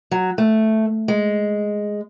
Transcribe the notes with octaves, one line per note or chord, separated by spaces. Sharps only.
F#3
A3
G#3